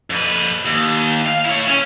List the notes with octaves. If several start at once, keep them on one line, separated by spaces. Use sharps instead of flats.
F2 B4
D#2
F5
E4 C#5
C#4